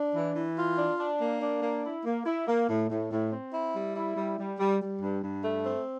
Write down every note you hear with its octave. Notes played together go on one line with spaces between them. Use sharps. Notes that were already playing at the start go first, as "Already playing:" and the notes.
Already playing: D4
E3
E3
F4
D4
D4
A#3
D4
A#3
E4
A#3
E4
A#3
A2
A2
A2
C4
E4
G3
E4
G3
G3
G3
G3
G2
G2
A3
C4